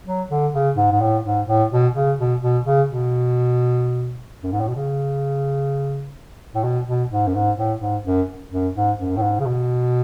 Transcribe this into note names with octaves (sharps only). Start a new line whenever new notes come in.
F#3
D3
C#3
G#2
G#2
A2
G#2
A2
B2
C#3
B2
B2
C#3
B2
F#2
G#2
A2
B2
C#3
A2
B2
B2
G#2
F#2
G#2
A2
G#2
F#2
F#2
G#2
F#2
A2
G#2
C#3
B2